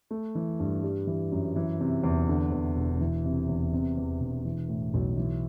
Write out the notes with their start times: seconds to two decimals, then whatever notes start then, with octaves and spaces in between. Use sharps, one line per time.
0.11 A3
0.35 E3
0.60 G2
0.83 G3
1.07 E3
1.32 F#2
1.56 E3
1.81 C3
2.04 E2
2.28 D3
2.52 E2
2.76 E1
3.01 E3
3.25 C3
3.49 E2
3.73 C3
3.98 E2
4.20 E1
4.45 E3
4.69 A2
4.94 B1
5.17 E3